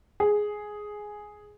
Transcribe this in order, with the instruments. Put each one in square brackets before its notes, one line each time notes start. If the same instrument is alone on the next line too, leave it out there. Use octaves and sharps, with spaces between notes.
[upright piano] G#4